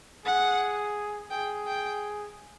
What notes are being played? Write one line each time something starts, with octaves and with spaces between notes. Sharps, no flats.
G#4 F#5
G#4 G5
G5